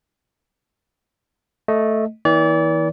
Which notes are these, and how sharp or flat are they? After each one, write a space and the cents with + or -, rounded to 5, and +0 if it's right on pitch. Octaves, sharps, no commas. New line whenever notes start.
A3 +0 D#5 +10
E3 -40 A#3 +35 D5 -35